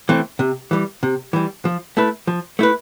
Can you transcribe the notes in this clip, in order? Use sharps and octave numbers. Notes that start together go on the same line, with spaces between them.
E3 A3 C4
C3
E3 G3
C3
E3 G3
F3
A3 E4 B4
F3
A3 E4 B4